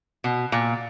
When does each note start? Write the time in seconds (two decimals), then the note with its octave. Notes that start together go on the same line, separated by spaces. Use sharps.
0.24 B2
0.52 A#2